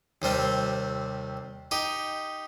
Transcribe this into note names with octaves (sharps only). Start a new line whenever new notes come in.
D#2 C3 G3 C4
D#4 G4